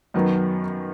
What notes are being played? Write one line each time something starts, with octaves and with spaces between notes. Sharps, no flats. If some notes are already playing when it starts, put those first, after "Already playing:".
F#2 D#3 F#3 B3